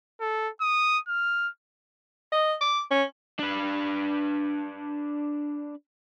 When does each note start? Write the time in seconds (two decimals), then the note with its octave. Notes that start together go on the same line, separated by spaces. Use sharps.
0.21 A4
0.61 D#6
1.08 F6
2.32 D#5
2.61 D6
2.91 C#4
3.39 D4 B4